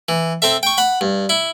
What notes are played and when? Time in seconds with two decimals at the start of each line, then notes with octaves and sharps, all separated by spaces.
0.09 E3
0.42 C4 A4 E5
0.63 G5 C#6
0.78 F#5 B5
1.01 G2
1.29 E4